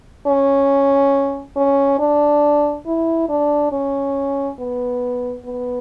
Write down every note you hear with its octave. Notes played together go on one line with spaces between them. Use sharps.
C#4
C#4
D4
E4
D4
C#4
B3
B3